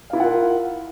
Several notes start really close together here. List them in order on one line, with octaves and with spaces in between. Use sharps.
F5 E4 F4 F#5 A#4